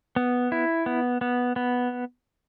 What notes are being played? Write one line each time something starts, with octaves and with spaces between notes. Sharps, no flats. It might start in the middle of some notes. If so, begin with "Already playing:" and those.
B3
E4
B3
B3
B3